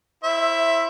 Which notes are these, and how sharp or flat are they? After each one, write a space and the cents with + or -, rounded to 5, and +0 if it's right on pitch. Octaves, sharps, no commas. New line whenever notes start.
E4 +0 C5 +25 E5 +10